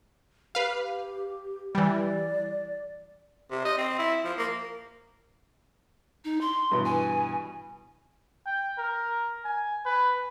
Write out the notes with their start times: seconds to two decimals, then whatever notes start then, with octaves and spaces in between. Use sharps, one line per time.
0.55 G4 B4 F5
1.75 E3 G3 D5
3.51 C3
3.65 D#5
3.78 C4
3.99 E4
4.24 F3
4.38 A#3
6.25 D#4
6.41 C6
6.71 G2 B2 E3
6.85 G#5
8.46 G5
8.78 A#4
9.44 G#5
9.86 B4